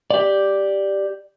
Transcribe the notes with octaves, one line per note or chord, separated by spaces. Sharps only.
G4 D5